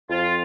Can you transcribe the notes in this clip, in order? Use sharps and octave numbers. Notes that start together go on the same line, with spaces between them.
F2 F3 F4